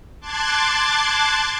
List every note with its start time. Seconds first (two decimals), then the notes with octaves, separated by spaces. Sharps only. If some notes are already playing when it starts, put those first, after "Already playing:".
0.20 A5 C6 D6 F#6 G#6 A6